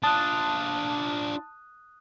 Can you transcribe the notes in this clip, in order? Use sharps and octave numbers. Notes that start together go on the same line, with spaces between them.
D4 F4 A5 D#6 F#6